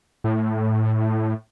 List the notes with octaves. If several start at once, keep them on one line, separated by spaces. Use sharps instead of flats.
A2